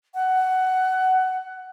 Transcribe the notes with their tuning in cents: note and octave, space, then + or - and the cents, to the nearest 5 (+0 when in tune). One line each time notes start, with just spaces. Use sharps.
F#5 +15